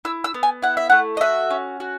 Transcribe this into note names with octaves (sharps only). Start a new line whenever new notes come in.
E4 E6
E6
B3
G#5
E4 F#5
E5
A3 F#5
D#5
F#4 E5
C#4
F#4